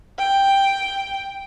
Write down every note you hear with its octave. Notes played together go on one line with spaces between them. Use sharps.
G5